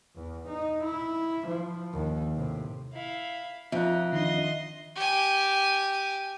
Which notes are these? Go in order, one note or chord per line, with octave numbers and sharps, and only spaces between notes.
E2
D#4
E4
F3
D#2
A2 C3
E4 F5
F2 D#4 E5 F#6
D#3 D4 D#5 C6
G4 G#5